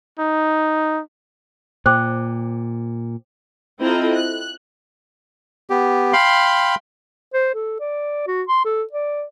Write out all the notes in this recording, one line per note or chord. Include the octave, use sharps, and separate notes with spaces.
D#4
A#2 C5 G5 D6
C4 E4 F4 A4 D#5 A#5
F#6
B3 G4
F5 G5 B5 C6
C5
A4
D5
F#4
C6
A4
D5